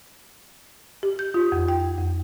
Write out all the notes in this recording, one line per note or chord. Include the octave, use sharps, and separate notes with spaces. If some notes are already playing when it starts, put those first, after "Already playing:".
G4
G6
F4
F2
G5
F2